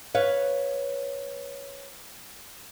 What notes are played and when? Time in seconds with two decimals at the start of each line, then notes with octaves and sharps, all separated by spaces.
0.15 B4 C#5 F5